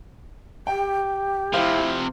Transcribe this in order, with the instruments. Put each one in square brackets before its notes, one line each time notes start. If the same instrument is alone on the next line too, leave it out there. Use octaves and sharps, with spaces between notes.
[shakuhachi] G4 [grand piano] G5
[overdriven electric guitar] C3 F3 [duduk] E4 [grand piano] C5 F5